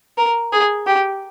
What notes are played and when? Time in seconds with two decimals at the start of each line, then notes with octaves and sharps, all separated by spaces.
0.18 A#4
0.52 G#4
0.87 G4